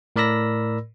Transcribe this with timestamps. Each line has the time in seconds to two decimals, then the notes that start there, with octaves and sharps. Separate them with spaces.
0.16 A2 A#4 D5 B5 E6 A#6